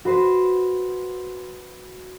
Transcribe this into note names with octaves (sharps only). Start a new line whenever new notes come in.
F#4 B4 C5